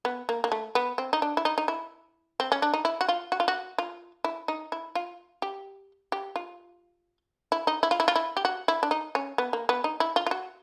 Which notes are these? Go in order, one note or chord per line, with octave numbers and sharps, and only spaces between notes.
B3
A#3
A#3
A3
B3
C4
D#4
D4
E4
D#4
D#4
E4
C4
C#4
D4
D#4
E4
F#4
F4
F#4
F4
F#4
F4
E4
D#4
E4
F4
G4
G4
F4
E4
D#4
E4
F4
E4
F4
E4
G4
F#4
E4
D4
D#4
C#4
B3
A#3
B3
D#4
E4
F4
F4
F#4